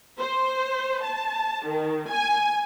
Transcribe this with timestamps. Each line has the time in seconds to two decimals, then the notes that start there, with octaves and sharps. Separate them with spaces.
0.19 C5
1.04 A5
1.66 D#3
2.10 G#5